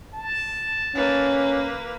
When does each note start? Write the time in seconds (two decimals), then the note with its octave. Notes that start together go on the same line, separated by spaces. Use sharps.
0.14 A5
0.95 A#3 C#4 B4